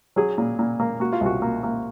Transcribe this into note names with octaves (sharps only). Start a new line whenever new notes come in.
F#3 G#4
A#2
A#2
A#3
A#3 F#4
F4
C2 F#4
A#3
A#3